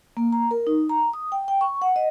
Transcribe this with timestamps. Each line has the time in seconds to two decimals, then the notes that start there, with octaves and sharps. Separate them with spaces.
0.17 A#3
0.32 A#5
0.51 A#4
0.67 D#4
0.89 A#5
1.14 D#6
1.32 G5
1.48 G5
1.61 C#6
1.82 F#5
1.96 D#5